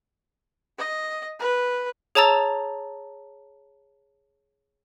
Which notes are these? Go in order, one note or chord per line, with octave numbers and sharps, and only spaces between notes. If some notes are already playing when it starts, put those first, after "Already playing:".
D#5
B4
G#4 C#5 A5 A#5 E6 A6